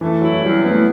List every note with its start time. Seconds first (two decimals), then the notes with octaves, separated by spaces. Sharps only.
0.01 E3 A3
0.21 F#3 E4
0.33 F#3
0.42 E2 G3
0.62 B3 E4
0.69 A3